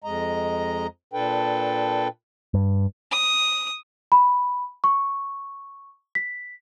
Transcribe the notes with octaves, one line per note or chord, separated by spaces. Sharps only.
F2 G#3 D#5 A#5
A#2 D4 A4 B4 G5
G2
D#6
B5
C#6
B6